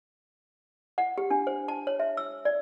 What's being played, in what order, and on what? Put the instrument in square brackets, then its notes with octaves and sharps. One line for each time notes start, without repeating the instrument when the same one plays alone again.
[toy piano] F#5
G4
D4
C5
A5
C#5
E5
E6
D5